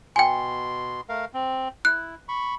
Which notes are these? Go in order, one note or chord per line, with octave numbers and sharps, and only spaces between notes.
B2 G5 G#5 C6
A3 A#4 F5
C4
E4 F#6
B5 C#6